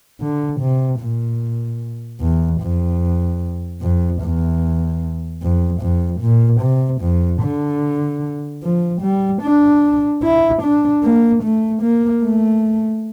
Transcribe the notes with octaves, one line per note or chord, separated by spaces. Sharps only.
D3
C3
A#2
E2
F2
F2
E2
F2
F2
A#2
C3
F2
D3
F3
G3
D4
E4
D4
A#3
A3
A#3
A3